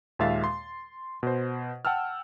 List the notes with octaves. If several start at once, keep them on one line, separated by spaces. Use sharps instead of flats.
D#2 A#2 G#3 E5 F5 A6
C6
B2 C5
F#5 G5 A5 E6 F6